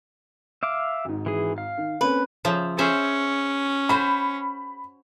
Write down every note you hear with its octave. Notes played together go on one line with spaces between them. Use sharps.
E5 F5 D6
G#1 G#2
E3 G#4
F5
D#3
A#3 C4 C#4 B4
C#3 F3 E5
C#4 G#4 C5 E5
F#4 C5 B5